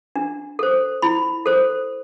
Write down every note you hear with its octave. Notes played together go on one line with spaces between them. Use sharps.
D4
A4 C5
E4 B5
A4 C5